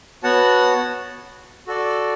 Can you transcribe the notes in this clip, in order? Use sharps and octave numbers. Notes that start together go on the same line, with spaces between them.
B3 F#4 C#5 F#5 A5
F#4 A4 D5